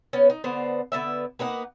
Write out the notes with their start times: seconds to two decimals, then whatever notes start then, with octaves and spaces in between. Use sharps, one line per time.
0.13 B3 C#4
0.30 D#4
0.44 D3 B3 C5
0.92 D3 B3 E4 E5
1.39 A#3 B3 D#4 F#5